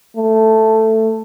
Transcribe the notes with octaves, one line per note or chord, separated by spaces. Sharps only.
A3